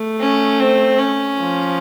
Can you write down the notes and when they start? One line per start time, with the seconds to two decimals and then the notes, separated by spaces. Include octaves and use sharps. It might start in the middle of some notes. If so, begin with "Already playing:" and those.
Already playing: A3
0.20 C#4
0.60 C4
0.99 C#4
1.39 F3